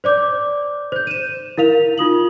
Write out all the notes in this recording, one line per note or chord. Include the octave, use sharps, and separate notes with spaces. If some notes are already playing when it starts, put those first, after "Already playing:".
C5 D5 D6 G6
C5 G6
D#7 E7
E4 A#4 F5 F7
D#4 F4 D#6 F#7